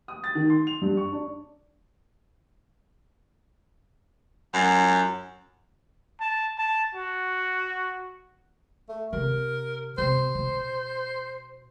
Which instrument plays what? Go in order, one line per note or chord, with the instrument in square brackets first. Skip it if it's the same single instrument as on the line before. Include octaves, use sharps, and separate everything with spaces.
[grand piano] D#6
A6
D#3
C6
F7
G2
C#6
D4
[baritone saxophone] F#2
[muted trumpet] A5
A5
F#4
[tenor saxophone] A3
[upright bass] C3 [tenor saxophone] A#4
[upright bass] C3 [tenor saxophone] C5
[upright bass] B2